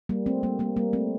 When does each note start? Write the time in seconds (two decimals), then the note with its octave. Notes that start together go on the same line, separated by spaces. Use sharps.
0.09 G3 A#3
0.26 A3 C4
0.43 G3 A#3
0.59 G3 A#3
0.77 G3 A#3
0.93 A3 C4